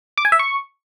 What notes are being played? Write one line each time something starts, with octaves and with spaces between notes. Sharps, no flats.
D6
G#5
E5
C#6